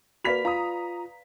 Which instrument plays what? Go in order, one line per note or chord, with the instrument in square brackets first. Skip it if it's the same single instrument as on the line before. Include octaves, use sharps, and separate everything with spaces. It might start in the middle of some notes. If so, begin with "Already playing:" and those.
[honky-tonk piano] A#3 B6 F7 [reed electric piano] F#4 [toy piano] B4 D5 B5
[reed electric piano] F4 [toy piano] F5 [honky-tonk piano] A#5 D#6